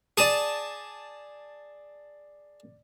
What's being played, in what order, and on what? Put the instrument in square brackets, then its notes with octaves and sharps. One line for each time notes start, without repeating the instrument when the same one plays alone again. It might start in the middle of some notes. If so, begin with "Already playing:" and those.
[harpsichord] G#4 A5 [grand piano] D5 D#7